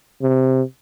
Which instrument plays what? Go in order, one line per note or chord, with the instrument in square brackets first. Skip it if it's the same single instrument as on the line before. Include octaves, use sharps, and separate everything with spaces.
[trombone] C3